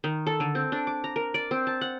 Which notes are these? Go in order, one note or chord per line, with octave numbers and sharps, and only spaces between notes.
D#3
A4
D3
C4
D4
D6
A#5
A#4
D5
C4
A5
F#5